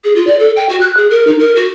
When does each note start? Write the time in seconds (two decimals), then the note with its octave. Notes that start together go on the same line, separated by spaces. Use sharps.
0.04 G#4
0.16 F4
0.27 D5
0.39 A4
0.56 G5
0.69 F#4
0.81 F#6
0.97 G#4
1.11 A#4
1.27 D#4
1.39 A#4
1.55 F#4